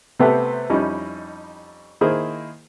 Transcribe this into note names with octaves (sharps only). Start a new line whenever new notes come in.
C3 A3 B3 G4 B4
F2 G3 C#4 D#4 E4
D#3 A#3 E4 G#4 A#4 C5